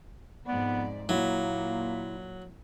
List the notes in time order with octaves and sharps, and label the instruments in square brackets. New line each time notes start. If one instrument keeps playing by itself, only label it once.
[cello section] F2 G#2 D5 [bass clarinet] B3
[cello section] A#2 [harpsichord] F#3 [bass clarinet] A#3 [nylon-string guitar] E4